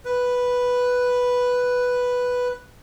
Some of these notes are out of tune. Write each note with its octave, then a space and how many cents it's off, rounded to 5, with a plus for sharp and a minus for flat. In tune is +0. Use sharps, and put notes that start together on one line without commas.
B4 +0